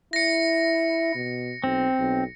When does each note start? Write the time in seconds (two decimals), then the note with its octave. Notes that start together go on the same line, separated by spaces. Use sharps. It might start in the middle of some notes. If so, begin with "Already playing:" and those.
0.13 E4 A#6 C#7
1.15 B2
1.64 B1 C4
1.99 B1